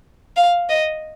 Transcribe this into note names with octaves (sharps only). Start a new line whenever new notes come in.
F5
D#5